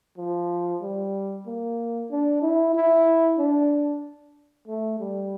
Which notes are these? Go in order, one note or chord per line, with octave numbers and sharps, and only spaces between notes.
F3
G3
A#3
D4
E4
E4
D4
A3
G3